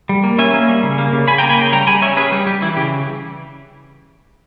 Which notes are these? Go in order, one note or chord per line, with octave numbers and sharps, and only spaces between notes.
G3
A#3
C#4 E5 G#5
A#3
G3
C#3
A#3
C#3
C#3 G#5 B5
G5 A#5
A#3
G#5 B5
C#3 G5 A#5
G3 G5 A#5
G3 G#5 B5
C#4 C#5 E5
C#4 G#4 B4
G3 G4
G3 G4
E3 E4
C#3 G4